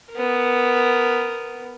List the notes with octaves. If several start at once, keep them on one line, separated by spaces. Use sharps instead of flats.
B3 A#4